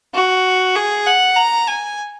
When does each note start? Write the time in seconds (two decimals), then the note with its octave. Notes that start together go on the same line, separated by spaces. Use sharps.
0.14 F#4
0.75 G#4
1.06 F#5
1.37 A#5
1.67 G#5